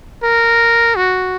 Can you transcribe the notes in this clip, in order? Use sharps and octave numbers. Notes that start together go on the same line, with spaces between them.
A#4
F#4